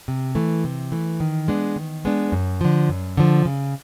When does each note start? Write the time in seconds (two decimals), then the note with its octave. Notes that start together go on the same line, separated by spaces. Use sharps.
0.08 C3
0.35 E3 A3
0.64 C3
0.92 E3 A3
1.20 D#3
1.48 G#3 B3 D4
1.76 D#3
2.05 G#3 B3 D4
2.32 F#2
2.61 D3 F3
2.89 F#2
3.17 D3 F3
3.45 C#3